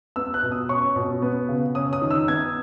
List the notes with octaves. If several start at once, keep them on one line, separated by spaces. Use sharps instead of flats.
B3 E6
F#6
B2
D#6
C#4 C#6
B2
B3
C#3
C#4 D#6
D#6
D#3
E6
B3 G#6